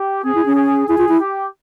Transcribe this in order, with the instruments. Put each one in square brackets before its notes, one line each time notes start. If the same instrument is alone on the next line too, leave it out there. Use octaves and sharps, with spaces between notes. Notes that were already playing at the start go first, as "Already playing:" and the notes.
Already playing: [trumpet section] G4
[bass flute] C4 [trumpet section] G#4
[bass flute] E4
C#4
[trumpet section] G#4
[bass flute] E4 [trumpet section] G#4
[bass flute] F4
E4
[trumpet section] G4